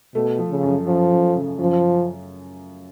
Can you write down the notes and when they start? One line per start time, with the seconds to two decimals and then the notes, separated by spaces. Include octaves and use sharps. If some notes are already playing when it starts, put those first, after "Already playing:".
0.15 B2 A3
0.38 F3
0.50 C#3
0.63 F#2
0.87 F#2 F3
1.11 F#2
1.35 C#3
1.59 F#2 F3